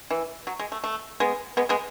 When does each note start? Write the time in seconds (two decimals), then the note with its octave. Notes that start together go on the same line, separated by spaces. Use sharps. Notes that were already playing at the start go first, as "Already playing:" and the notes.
0.11 E3
0.47 F#3
0.59 G#3
0.72 A3
0.84 A3
1.20 G#3 B3
1.57 G#3 B3
1.69 G#3 B3